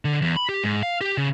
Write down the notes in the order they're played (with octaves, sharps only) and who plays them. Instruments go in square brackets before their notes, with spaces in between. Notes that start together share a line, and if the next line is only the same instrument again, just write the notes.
[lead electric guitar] D3
E2
B5
G4
G#2
F5
G4
C#3